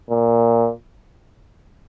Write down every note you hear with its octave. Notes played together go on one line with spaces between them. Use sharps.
A#2